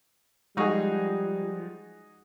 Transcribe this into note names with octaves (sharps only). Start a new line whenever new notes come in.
F3 G3 G#3 D#4 F#4 G#4 C#6